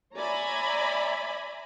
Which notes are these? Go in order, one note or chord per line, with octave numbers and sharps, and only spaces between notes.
C#5 D5 E5 G#5 A#5 B5